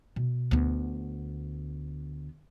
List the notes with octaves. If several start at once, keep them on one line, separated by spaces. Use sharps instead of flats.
B2
D2 B3